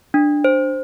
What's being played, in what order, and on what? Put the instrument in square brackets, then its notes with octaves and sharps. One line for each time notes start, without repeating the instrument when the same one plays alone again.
[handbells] D4
C5